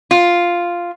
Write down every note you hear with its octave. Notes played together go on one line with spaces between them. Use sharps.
F4